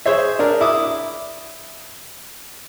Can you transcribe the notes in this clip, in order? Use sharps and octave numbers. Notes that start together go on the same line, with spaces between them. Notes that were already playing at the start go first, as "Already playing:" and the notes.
G#4 C5 C#5 E5
D4 G#4 A#4
E4 D6 D#6